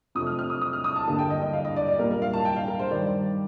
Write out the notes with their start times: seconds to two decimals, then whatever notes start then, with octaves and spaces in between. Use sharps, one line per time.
0.15 F2 C3 F3 A3 D#6
0.27 F6
0.39 F6
0.50 D#6
0.62 D#6
0.73 F6
0.84 D#6
0.96 A5
1.07 G2 D3 G3 A#3 A5
1.19 G5
1.30 D#5
1.42 D#5
1.53 F5
1.65 D#5
1.76 D5
1.88 D5
1.99 A#2 G3 A#3 A#4
2.11 A#4
2.22 F5
2.33 A5
2.45 G5
2.56 F5
2.68 A#4
2.79 C5
2.91 G2 D#3 G3 D5